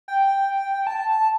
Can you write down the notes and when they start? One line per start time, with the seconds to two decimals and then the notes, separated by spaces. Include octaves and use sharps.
0.08 G5
0.87 A5